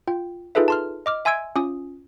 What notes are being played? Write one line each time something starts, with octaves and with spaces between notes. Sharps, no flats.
F4 G5
D#4 F4 G#4 A4 B4 E5
A5 C6 F6
D#5 D6 F6
E5 G#5 C6 E6 G#6 D7
C#4 F4 D#6